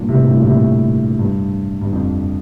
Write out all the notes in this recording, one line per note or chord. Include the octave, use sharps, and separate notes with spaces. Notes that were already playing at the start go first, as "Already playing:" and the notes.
Already playing: G2 A#2
A2 C3
G2
A2
A#2
A2 C3
G2
G2
F2